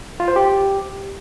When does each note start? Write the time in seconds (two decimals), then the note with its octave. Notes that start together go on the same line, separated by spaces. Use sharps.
0.20 F4
0.28 C5
0.36 G4